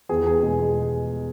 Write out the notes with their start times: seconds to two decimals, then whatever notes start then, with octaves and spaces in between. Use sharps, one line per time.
0.09 E2 G#4
0.27 G#4
0.43 B2 G#3
0.60 G#4